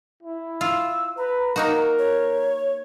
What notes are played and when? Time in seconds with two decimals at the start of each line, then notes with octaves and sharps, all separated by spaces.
0.23 E4
0.61 F4 E6
1.17 B4 A#5
1.56 A#3 D#4 F#4 A#4
1.99 C#5